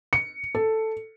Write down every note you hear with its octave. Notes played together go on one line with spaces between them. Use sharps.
C#7
A4